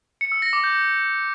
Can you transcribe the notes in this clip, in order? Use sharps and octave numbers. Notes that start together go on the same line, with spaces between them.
C#7
E6
A#6
D6
G6